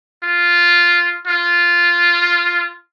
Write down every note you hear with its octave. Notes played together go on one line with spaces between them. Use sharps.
F4
F4